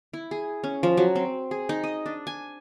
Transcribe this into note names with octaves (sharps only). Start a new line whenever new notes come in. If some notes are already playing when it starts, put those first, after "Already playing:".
E4
G#4
C#4
F3
F#3
C4
G#4
D#4
D#5
D4
G#5